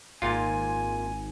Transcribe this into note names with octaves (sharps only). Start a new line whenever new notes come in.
G#1 A#2 F4 G#5